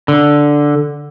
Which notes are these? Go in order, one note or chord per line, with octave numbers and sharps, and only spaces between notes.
D3